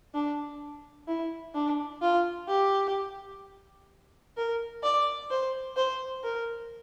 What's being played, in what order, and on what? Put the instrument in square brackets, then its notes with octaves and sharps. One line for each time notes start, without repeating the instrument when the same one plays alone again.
[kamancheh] D4
E4
D4
F4
G4
A#4
D5
C5
C5
A#4